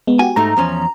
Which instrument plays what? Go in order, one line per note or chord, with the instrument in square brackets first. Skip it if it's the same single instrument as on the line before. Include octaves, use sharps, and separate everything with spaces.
[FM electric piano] G#3 B3
[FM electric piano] F#4 G4 [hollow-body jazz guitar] G#5
[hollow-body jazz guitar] G#2 A3 D#4 [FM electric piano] A#5
[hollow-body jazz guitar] E2 F3 C#4